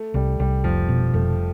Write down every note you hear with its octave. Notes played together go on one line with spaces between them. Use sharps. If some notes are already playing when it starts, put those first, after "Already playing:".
Already playing: A3
C2 G3
C2 G3
F1 F3
B2
F1 A3